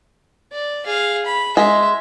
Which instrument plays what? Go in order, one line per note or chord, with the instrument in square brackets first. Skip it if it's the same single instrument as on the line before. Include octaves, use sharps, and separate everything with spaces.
[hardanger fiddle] D5
G#4 F5
B5
[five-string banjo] G#3 [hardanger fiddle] E5